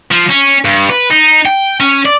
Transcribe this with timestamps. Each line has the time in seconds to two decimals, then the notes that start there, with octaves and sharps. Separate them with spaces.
0.11 F3
0.29 C#4
0.64 G2
0.90 B4
1.10 D#4
1.45 G5
1.80 C#4
2.05 D5